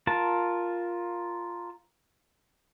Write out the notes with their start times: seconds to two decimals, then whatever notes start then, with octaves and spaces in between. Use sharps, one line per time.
0.07 F4 A#4 A5